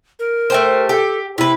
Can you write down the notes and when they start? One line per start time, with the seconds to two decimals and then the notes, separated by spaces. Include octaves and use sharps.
0.19 A#4
0.50 A3 G4 C5
0.89 G4 A4
1.38 C3 E4 B4